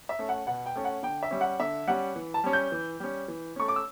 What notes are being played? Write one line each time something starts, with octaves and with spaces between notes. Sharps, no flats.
E5
A3 C#4
F#5
B2 F#5
G5
A3 C#4
F#5
D3 G5
E5
G3 C#4
F#5
D3 E5
G3 C#4 F#5
E3
A5
G3 C#4
G6
E3
G3 C#4
E3
A3 C#4 C#6
D6
E6